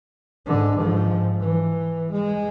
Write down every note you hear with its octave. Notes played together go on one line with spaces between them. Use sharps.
G#2 D3
G#2 F3
E3
G#3